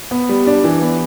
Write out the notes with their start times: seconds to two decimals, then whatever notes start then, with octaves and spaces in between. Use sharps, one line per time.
0.11 B3
0.29 G3
0.47 D4
0.64 E3
0.82 B3